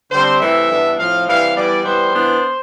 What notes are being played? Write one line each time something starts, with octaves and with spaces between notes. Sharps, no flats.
D3 G3 C4 C5
C3 E3 A3 C4 E5
G2 E3 B3 D4
A2 F3 C4 F5
C3 E3 G3 F5
E3 G3 B3 D5
E3 G3 B3 C5
E3 B3 D4